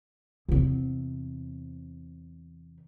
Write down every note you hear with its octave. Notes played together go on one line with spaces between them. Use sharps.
E2 C3